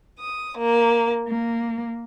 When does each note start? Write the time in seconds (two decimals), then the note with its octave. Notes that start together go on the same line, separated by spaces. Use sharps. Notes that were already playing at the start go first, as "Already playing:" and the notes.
0.21 D#6
0.57 A#3
1.29 A#3